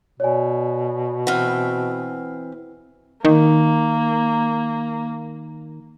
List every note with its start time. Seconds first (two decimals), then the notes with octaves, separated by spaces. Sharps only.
0.20 B2 C#5 D5 G#5
1.27 E3 C4 F#5 F6
3.25 D#3 A#3